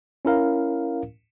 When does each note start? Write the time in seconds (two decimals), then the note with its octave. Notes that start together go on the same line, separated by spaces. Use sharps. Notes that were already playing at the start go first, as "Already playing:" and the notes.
0.25 C#4 E4 A#4 F5